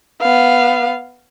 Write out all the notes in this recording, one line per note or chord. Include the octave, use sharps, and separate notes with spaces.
B3 F5